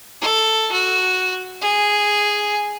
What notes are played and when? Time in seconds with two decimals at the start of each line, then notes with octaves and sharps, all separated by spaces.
0.21 A4
0.72 F#4
1.62 G#4